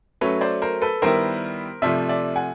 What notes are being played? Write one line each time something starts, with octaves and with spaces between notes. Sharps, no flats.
F#3 A3 C#4 B4 C#5
C5 D5
A#4 C5
A4 B4
D#3 G3 B3 E4 A#4 C5
C3 F3 A3 D5 E5
D5 E5
F#5 G#5